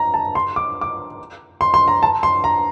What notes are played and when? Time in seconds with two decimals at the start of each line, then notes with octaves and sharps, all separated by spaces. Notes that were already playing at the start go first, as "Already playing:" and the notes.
Already playing: A#5
0.14 A5
0.35 C6
0.56 D6
0.81 D6
1.61 C6
1.74 C6
1.88 A#5
2.03 A5
2.23 C6
2.44 A#5